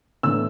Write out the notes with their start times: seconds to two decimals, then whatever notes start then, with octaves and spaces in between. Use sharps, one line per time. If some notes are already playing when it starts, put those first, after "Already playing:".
0.23 A2 E3 B3 D4 E6